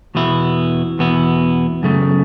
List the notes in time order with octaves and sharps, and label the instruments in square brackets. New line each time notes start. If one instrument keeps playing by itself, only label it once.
[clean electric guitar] E2 B2 B3 E4
E2 B2 B3 E4
F#2 C#3 A3